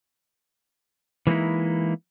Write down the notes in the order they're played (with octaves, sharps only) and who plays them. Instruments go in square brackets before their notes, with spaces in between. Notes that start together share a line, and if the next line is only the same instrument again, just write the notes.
[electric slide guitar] E3 G#3 A#3 C#4 D#4 E4